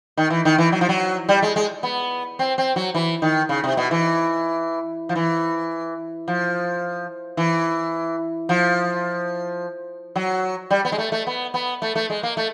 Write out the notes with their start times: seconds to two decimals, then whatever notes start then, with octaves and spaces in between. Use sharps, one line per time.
0.17 D#3
0.30 E3
0.45 D#3
0.58 E3
0.72 F#3
0.81 F3
0.89 F#3
1.29 G3
1.42 G#3
1.56 G#3
1.83 B3
2.39 C4
2.58 C4
2.76 F#3
2.95 E3
3.22 D#3
3.49 C#3
3.64 C3
3.77 B2
3.91 E3
5.09 F3
5.16 E3
6.28 F3
7.37 E3
8.49 F3
10.16 F#3
10.70 G3
10.85 B3
10.92 G#3
10.98 A3
11.12 A3
11.27 B3
11.54 B3
11.82 A3
11.95 A3
12.10 G#3
12.23 A#3
12.37 A3